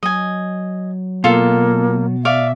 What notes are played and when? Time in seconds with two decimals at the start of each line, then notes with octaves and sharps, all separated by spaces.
0.03 F#3 D#5 G#5
1.24 B2 A#3 F4 A4
2.25 D5 E5 F5 C#6